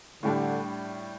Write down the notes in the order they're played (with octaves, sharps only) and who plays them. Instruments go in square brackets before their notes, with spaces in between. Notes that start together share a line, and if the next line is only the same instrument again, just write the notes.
[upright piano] A2 G3 D4 [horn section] D3